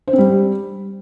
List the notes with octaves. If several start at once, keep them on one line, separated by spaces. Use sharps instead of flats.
C5
C4
G3